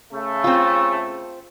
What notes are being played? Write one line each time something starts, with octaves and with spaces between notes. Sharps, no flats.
C#3 A3
C4 F4